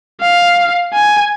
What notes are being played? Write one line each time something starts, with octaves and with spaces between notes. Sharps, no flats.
F5
G#5